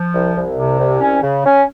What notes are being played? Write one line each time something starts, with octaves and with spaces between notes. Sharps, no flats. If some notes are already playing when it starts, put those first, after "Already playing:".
Already playing: F3
C2
C2
C3
C2
C#4
C#3
C#4